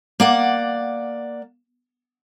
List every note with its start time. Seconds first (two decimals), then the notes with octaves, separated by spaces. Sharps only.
0.20 A#3 D5 F#5